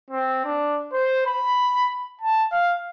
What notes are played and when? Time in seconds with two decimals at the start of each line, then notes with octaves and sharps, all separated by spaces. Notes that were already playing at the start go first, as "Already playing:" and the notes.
0.11 C4
0.44 D4
0.93 C5
1.26 B5
2.22 A5
2.52 F5